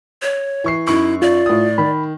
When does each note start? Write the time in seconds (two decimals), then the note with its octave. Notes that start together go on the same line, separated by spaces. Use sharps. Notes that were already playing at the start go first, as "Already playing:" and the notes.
0.22 C#5
0.64 E3 C#6 C7
0.88 F#2 D#4 E4 C#6
1.22 F4 D5
1.46 A2 D#6
1.78 D#3 B5